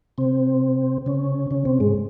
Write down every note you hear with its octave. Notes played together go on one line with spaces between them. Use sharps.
C3 C4
C#3 C#4
C#3 C#4
C3 C4
G#2 G#3